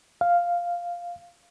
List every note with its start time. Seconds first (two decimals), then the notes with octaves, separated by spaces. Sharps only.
0.21 F5